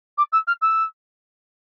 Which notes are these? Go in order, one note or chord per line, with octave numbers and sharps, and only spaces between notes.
D6
E6
F6
E6